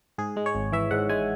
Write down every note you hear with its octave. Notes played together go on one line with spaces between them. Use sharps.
G#2 G#4
G#3
C#5
G#1
E3 E5
G#2 F#5
G#3 G#5